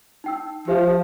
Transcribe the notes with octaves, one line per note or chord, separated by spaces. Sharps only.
D#4 G5 E6
F3 G4 C5 E5